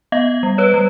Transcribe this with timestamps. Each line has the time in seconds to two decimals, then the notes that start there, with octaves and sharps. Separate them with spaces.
0.12 B3 D#5 F5
0.43 G3
0.58 B4 C#5
0.74 G3